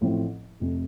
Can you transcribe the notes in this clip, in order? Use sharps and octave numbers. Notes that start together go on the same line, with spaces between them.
A1 A2 F3 C4
F1 F2 C3